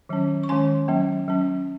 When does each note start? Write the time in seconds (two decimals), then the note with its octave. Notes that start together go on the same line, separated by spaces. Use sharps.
0.09 D#3 F#3 C#4
0.43 C#6
0.49 D#3 G#3 C#4 G#5 C6
0.88 F#3 A#3 C#4
1.28 F#3 C#4